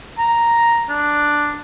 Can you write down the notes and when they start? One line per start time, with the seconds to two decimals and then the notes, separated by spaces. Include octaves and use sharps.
0.18 A#5
0.90 D4